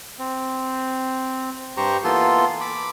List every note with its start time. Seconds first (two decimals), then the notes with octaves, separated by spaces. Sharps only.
0.19 C4
1.77 G2 G4 C5 A#5 C#6
2.04 E3 A#3 B3 F4 A4 C6
2.61 B5 D6